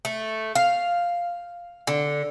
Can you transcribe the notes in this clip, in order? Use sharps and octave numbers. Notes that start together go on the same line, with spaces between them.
A3
F5
D3